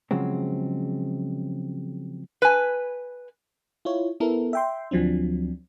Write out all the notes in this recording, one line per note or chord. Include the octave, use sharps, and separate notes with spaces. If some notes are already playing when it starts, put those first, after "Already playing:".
C#3 F3 F#3 G#3 C4
B4 G#5
E4 F4 C#5
B3 E4 A4 A#4
E5 G5 C6
D2 F3 F#3 C4 D4